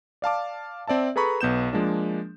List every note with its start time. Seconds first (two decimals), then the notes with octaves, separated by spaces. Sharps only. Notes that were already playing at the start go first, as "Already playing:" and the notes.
0.22 D5 F5 A5 D6
0.87 C4 D5 E5 A5
1.16 G#4 A4 B4 A#5 B5 C#6
1.41 B1 B3 G6 E7
1.73 F3 G#3 A#3 D4